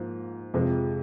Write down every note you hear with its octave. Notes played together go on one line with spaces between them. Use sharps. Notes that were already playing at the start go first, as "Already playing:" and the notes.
Already playing: G#2 F3 A#3
F2 C3 F3 G#3